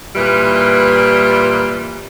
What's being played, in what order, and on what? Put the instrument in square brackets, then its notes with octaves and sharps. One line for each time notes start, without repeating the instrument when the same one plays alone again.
[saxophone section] A#2 E3 G3